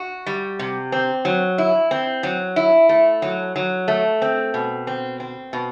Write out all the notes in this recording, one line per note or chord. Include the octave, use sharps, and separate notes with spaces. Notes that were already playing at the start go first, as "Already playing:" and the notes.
Already playing: F#4
G3
C3
C4
F#3
E4
C4
F#3
E4
A3
F#3
F#3
A3
C4
B2
C4
C4
B2